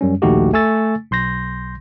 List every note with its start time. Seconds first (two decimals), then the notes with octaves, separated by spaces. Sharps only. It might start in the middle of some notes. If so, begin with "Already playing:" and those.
0.01 F#2 G3 C#4
0.22 A#1 D#2 A3 D#4 F#4 G4
0.53 A3 G#5 C#6 E6 A6
1.11 B1 C6 G6 A#6